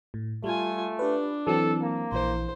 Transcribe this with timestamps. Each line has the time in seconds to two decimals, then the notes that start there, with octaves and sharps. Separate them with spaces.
0.14 A2
0.44 G3 A3 F4 G#5
0.99 D4 G4 B4
1.47 E3 F#3 C4 A4
1.82 A#3
2.12 A#1 E3 C5